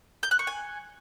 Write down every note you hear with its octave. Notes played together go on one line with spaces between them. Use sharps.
G6
F#6
C#6
G#5